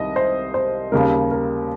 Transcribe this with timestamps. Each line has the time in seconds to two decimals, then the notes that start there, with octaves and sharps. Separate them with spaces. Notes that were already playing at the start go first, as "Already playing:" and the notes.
Already playing: C2 C3 D#3 D#5
0.16 C5
0.54 C5
0.92 D#2 C#3 G3 A#4
1.31 A#4